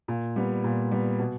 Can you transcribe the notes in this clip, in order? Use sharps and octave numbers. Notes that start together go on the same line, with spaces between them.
A#2
G3 B3
A#2
G3 B3
B2